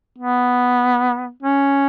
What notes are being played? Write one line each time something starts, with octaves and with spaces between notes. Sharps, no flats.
B3
C#4